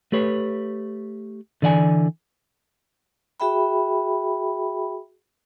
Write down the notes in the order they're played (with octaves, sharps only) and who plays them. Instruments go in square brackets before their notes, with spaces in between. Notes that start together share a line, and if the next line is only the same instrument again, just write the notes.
[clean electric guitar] A3 G4 B4 C#5
D3 E3 D5 F5 G#5
[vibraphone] F#4 G#4 E5 G5 B5